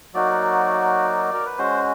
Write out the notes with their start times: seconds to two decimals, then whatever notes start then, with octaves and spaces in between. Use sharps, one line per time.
0.14 F#3 A#3 D#4 F#4 D5
1.34 A#4
1.46 B4
1.58 G#3 C#4 F#4 C5